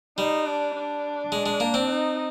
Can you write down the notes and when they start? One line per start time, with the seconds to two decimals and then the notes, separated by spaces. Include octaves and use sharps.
0.18 G3 D#4
0.47 D4
0.75 D4
1.32 G#3
1.46 G#3
1.60 A#3
1.74 C4
1.89 D#4